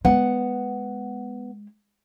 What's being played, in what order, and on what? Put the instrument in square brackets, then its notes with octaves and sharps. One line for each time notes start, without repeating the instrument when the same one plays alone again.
[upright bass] G#3 [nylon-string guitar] B3 F#5